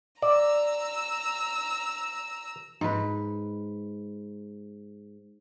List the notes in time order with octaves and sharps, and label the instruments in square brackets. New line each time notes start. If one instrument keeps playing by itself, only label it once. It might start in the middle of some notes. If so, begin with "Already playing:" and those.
[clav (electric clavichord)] D5 [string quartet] A#5 E6
[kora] G#2 B4